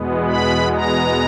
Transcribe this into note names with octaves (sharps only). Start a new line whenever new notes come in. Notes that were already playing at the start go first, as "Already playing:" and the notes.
Already playing: E2 B2 G#3 B3
B5
A#5